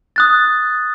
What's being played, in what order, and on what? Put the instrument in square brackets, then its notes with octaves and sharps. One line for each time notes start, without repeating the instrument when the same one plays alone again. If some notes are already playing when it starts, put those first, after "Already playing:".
[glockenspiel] D#6 F#6 A6